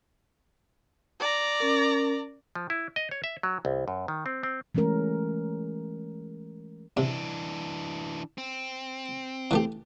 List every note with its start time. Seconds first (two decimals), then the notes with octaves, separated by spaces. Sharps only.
1.20 D5 A#5
1.60 C#4 A#4
2.55 F3
2.70 E4
2.96 D#5
3.11 C#5
3.24 E5
3.43 F#3
3.65 C2
3.88 F#2
4.08 D#3
4.26 C4
4.43 C4
4.75 E3 G#3 A3 C#4 A#4
6.97 C3 E3 D4
8.38 C4
9.51 E3 A3 G4